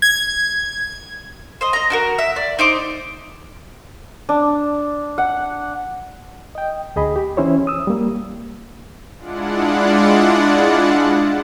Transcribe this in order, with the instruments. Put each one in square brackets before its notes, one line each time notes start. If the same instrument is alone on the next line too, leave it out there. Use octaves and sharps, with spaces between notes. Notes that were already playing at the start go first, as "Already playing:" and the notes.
[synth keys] G#6
[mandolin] C5 D#5
D#5 A#5
D4 F#4 A#4
E5
D5
D#4 C5 D6
[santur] D4
F#5
[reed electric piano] D#5 G5
D2 G#4 D#5 B5
G4
E3 C#4 E4 C5 C#5
D#6 E6
G3 A#3
[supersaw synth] G#3 D4 E4 F4 D5 F#5